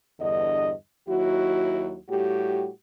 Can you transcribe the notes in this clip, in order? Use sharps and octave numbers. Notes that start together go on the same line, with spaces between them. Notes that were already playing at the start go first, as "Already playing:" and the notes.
E2 G2 D3 D#5
D#2 F#3 E4 F#4
A2 G3 F#4 G4